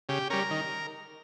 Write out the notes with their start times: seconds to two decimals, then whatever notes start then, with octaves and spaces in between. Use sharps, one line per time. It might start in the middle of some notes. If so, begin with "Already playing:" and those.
0.09 C#3 G4
0.30 G3 C#4 A#4
0.51 D#3